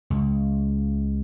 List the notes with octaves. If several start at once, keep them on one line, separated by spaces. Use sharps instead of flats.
C#2